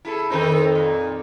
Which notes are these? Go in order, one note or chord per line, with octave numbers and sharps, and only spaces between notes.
E4 G#4 A4
F2 D#3 C4 D#4
A#2